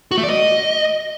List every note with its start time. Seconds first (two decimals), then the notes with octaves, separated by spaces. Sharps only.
0.11 F#4
0.17 A3
0.24 D5
0.30 D#5